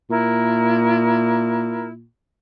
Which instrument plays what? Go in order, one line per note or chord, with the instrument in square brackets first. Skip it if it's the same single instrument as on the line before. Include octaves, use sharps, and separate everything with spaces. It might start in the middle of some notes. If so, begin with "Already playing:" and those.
[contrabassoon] A#2 [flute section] E4 A#4